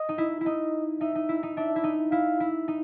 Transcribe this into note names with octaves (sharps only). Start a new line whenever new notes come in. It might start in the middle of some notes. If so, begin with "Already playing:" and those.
Already playing: D#5
D#4
E4
E4
D#4 D#5
D#4 E5
D#4
E4
D#4
D4 E5
E4
D#4
E4 F5
E4
D#4